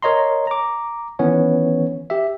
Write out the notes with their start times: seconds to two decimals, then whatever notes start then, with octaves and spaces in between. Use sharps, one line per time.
0.02 A#4 C#5 D#5 A#5 C6
0.47 A#5 D6
1.19 D#3 E3 B3 C#4 C#5
2.10 G4 E5